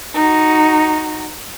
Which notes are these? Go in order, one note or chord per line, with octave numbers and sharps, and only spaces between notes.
D#4 F#4